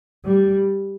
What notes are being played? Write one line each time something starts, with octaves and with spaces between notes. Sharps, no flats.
G3